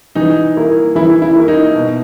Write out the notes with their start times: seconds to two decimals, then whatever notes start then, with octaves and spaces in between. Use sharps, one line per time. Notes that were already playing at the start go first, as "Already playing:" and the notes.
0.15 E3 D#4
0.56 A#3 E4 A#4
0.95 E3 E4
1.22 E4
1.35 A#3 E4 A#4
1.48 D#4
1.75 B2